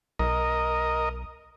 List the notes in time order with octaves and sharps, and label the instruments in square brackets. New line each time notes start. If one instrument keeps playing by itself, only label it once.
[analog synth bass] B1 [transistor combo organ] A#4 D#5